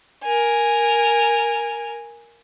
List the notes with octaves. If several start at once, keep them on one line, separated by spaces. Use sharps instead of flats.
A#4 G#5